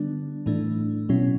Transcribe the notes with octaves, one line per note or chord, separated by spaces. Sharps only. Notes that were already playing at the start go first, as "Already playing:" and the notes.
Already playing: D3 G3 B3 D4
A2 E3 A3 D4
B2 F#3 C#4 E4